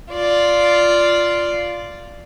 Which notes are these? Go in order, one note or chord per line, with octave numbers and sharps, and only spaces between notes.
F4 D5